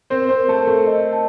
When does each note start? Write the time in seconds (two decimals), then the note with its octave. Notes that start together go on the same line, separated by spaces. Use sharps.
0.10 C4 A#4 C5
0.29 C4 C5
0.36 A#4
0.48 A3 A4
0.62 A#4
0.67 A3 A4
0.87 D#5
1.13 A5